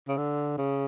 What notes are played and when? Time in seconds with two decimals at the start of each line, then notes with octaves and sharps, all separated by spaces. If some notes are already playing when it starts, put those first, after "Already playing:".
0.08 C#3
0.18 D3
0.58 C#3